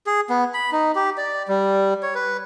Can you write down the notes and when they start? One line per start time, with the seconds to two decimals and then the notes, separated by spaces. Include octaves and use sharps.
0.07 G#4
0.30 B3
0.54 B5
0.72 D#4
0.95 G4
1.18 D5
1.48 G3
2.03 C#5
2.15 B4